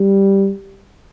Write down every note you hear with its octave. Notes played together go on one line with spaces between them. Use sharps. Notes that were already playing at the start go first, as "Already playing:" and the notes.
Already playing: G3